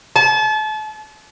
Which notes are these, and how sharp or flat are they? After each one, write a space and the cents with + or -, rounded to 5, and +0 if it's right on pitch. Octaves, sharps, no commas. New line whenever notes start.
A5 -35